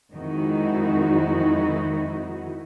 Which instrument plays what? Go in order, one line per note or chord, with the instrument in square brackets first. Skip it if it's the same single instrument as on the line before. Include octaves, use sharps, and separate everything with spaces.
[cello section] F2 D#3 G#3 D#4 E4 F#4